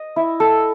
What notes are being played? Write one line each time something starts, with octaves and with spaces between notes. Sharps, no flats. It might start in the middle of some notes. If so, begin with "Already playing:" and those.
Already playing: D#5
E4
A4